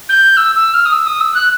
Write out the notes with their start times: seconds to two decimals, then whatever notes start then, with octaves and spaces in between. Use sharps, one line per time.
0.09 G6
0.37 E6
0.55 E6
0.74 F6
0.86 D#6
0.92 E6
1.06 D#6
1.20 E6
1.34 F#6